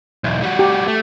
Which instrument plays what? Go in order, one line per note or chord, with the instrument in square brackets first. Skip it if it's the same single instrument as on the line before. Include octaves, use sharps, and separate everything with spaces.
[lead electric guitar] B1 E2
G3 F#4
[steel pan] G4
[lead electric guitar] A3